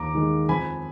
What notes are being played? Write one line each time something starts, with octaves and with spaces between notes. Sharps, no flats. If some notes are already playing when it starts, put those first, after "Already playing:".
Already playing: D#2 A#5 D6
D#3 G#3
F2 G#5 B5